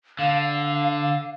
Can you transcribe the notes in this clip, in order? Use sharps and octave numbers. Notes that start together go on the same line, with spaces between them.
D3 F5